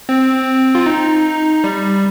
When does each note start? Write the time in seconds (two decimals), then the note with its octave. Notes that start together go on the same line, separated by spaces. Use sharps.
0.09 C4
0.75 F4
0.86 D#4
1.64 G3